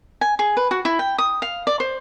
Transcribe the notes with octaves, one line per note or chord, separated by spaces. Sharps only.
G#5
G#4
B4
F#4
E4
G5
D#6
F5
D5
C5